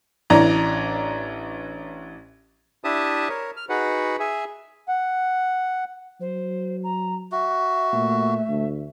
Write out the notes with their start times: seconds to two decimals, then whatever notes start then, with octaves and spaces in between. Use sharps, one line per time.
0.30 A1 E3 D4 A#5
2.84 D4 E4 G4 E5 A5 D#6
3.29 A#4 C#5
3.57 F6
3.69 D#4 F#4 G#4 B4 F#5
4.20 G#4 E5 G#5
4.88 F#5
6.21 F#3 C5
6.84 A#5
7.32 F#4 E5
7.93 A#2 A3
8.49 D2